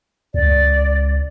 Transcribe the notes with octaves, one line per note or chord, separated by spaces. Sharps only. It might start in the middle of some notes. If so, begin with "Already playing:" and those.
C#2 D5